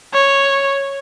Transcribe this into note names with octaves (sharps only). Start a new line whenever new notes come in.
C#5